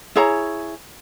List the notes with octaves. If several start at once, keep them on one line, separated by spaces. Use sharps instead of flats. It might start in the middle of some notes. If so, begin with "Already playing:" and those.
E4 G#4 C#5 A#5